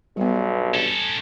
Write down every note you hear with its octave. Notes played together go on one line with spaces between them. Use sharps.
B1 G2 G3 B3
C#4 A4